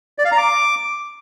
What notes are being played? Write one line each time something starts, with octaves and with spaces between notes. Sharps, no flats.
D5
F5
A#5
D6